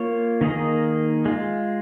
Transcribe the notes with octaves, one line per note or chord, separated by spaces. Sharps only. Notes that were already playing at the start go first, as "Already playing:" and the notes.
Already playing: A#3 F4 C#5
D#3 A#3 D#4 G#4 D#5
G#3 F4